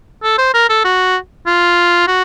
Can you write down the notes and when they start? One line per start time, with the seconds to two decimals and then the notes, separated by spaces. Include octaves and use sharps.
0.23 A4
0.38 C5
0.54 A#4
0.69 A4
0.85 F#4
1.46 F4
2.08 F#4